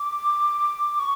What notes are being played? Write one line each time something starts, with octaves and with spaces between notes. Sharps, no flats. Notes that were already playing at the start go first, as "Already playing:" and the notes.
Already playing: D6
C#6